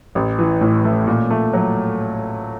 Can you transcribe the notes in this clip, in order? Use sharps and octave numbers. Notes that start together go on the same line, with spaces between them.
A1
E3
A2
A3
A#2
A3
F#3